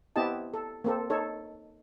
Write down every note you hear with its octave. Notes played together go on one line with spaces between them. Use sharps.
B3 C4 E4 G4 D#5 A5
A4
A#3 C4 A4
D#4 A4 C#5